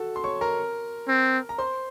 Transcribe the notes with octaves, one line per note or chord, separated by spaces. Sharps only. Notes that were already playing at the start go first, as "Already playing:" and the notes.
Already playing: F#4 A4 A5
C6
C#5 C#6
A#4 A#5
C4
A#5
C5 C6